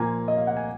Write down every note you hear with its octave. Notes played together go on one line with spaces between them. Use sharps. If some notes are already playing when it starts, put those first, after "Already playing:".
Already playing: A#2 F3 A#3 G#5
D#5
F5
F#5
G#5